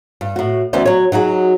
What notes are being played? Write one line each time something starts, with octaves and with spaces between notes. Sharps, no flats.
G2
A2 F#4
D2 E3 B3 C#4 C5 D5
F#3 C#5
F#3 D#4 F#4 G#4